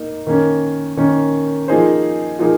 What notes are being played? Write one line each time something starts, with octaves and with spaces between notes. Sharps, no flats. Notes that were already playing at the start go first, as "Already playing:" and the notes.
Already playing: A#3 D#4
D#3 A#3 C#4
D#3 A#3 C#4
F3 A#3 D#4 G#4 C5
F3 A#3 D#4 G#4